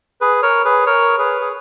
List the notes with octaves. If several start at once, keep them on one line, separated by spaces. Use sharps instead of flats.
G#4 B4
A#4 C#5
G#4 B4
A#4 C#5
G#4 B4
G#4